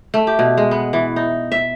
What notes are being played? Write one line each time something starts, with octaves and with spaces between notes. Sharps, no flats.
A3
G4
B2
G#3
B3
E3
D#4
E5